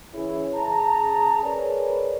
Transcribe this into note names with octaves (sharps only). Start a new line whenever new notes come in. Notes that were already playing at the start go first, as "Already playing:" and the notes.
E3 C#4 E4 G#4 C#5
C#3 G#4 A5 A#5
G#4 A#4 B4 C#5 D5